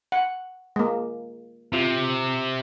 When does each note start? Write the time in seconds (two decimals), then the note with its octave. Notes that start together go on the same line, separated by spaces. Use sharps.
0.12 F#5
0.76 G#3 A#3
1.73 C3 F4